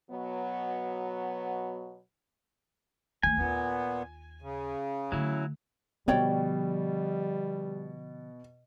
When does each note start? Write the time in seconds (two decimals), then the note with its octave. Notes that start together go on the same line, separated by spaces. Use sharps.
0.10 B2 F#3 B3
3.23 D#3 A3 G#5
3.37 D#2 A#2 B3 F4
4.42 C#3
5.12 D3 F#3 A3 E4
6.08 B2 D3 F3 G3 C#5 D5 G5